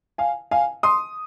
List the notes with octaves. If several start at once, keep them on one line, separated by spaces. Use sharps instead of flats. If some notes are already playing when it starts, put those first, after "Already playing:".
F5 G#5
F5 G#5
C6 D#6